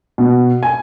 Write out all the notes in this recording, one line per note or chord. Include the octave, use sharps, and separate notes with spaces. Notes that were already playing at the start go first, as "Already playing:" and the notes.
B2
G#5